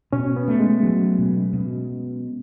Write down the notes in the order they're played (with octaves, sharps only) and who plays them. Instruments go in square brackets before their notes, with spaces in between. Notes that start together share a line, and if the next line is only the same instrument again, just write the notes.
[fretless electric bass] B2 [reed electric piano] C#4
[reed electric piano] B3
[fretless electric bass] A3
[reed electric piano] G#3
[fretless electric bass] F#3
B2
B2